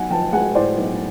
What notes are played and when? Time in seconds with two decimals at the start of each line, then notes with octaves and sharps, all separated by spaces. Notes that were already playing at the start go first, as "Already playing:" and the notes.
Already playing: B1 F#5 G#5
0.10 F3 G5 A5
0.33 G#3 F#5 G#5
0.55 A2 C5 D5
0.78 B1